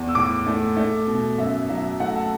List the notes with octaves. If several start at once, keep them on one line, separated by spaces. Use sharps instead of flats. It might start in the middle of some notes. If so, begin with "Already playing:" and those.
Already playing: E2
E6
A2 D6
A3
A3
B2
F#2 E5
F#3 E5
A3 F#5
A5